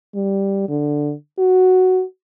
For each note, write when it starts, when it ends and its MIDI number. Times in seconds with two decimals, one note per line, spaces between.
0.15 0.65 55
0.69 1.13 50
1.39 2.03 66